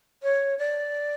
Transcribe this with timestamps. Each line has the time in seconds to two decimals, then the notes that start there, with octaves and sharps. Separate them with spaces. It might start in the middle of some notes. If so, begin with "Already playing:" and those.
0.23 C#5
0.59 D5